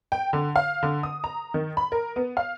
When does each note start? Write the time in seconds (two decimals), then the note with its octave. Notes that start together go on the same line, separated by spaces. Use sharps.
0.12 G5
0.33 D3
0.56 F5
0.83 D3
1.03 D#6
1.24 A#5
1.54 D#3
1.77 B5
1.92 A#4
2.16 B3
2.37 F5